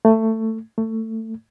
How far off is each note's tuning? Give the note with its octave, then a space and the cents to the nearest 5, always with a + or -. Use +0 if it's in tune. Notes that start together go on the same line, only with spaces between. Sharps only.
A3 +15
A3 +20